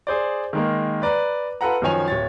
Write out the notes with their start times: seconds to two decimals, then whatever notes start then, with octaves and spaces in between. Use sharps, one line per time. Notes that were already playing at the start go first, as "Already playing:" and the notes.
0.07 G#4 C5 D5
0.53 D#3 G#3 A#3
1.02 B4 D5 A#5 F#6
1.61 F4 A4 B4 F#5 A#5
1.82 F#2 D#3 F3 C#5 G#5 F7
2.08 D1 C#5 A6